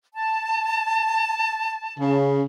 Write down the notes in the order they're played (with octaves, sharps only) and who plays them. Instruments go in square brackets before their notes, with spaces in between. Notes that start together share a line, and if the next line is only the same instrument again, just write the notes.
[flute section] A5
[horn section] C#3